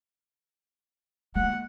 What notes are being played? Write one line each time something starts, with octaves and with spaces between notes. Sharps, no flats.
G#3 A#3 F#5